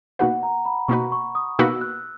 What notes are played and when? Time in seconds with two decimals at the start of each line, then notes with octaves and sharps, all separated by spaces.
0.19 B2 A#3 D#4 F#4 B4 F#5
0.43 A#5
0.65 B5
0.88 B2 A#3 D#4 F#4 B4 C#6
1.12 C#6
1.35 D#6
1.59 B2 A#3 D#4 F#4 B4 E6
1.81 F#6